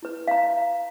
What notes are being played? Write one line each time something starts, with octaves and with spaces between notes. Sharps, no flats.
E4 B4
F5 A#5